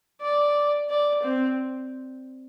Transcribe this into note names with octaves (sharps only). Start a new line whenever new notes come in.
D5
D5
C4